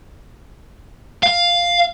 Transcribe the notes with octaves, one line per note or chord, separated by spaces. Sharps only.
F5